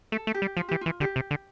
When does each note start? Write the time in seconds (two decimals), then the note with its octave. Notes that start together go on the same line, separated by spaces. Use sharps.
0.12 A3 A4
0.27 A3
0.34 G4
0.42 G3
0.57 F3 F4
0.69 E3 G4
0.81 E3 F4
1.00 D3 G4
1.16 C3
1.31 D3